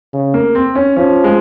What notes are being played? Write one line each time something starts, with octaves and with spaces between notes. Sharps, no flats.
C#3
A#3
C4
C#4
F3 C#4
G#3